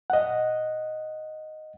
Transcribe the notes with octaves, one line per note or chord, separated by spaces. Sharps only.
D#5 F#5